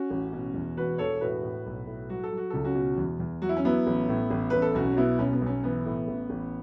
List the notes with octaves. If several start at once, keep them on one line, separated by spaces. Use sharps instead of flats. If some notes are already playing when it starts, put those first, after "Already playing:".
Already playing: C#4 F#4
A1
B2
E2
E1 F#4 B4
E1 A4 C#5
A2 F#4 B4
A2
B1
A2
F#3 F#4
A4
F#3
F#4
C#2 A4
C#4 F#4
B2
E2
E2
F#3 F#4
E4
C#4
F#3 B3 E4
A1
A2
A1
A1 B4
A4
B1 C#4 F#4
C#4
B2 B3 E4
B1 C#4
B3
B1 C#4
E3 B3
A2
A1
A1